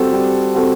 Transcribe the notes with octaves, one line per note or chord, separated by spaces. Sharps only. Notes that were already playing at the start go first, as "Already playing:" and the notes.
Already playing: G3 C4 F#4 A4
G3
C4 F#4 A4